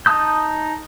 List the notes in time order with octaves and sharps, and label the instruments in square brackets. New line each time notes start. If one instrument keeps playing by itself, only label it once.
[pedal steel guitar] D#4 A5 D#6 G6